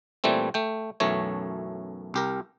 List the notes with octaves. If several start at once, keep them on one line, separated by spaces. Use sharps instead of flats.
A#2 E3 G3 A3 C4
A3 G5
B1 F#2 E3 A3 C#5
C2 G4 A#4